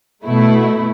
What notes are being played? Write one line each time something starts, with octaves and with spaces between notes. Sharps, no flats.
B2 A3 E4